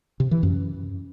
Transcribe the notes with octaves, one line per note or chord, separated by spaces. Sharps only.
C3
E3
F#2